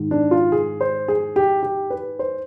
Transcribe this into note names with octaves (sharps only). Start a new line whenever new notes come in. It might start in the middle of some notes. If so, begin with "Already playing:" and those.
Already playing: G#2 D#3
D4
F4
G#4
C5
G#4
G4
G4
B4
C5